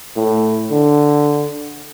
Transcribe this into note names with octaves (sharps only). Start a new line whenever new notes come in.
A2
D3